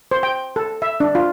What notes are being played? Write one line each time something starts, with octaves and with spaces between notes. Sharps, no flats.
C5
G5
A4
E5
D4
F4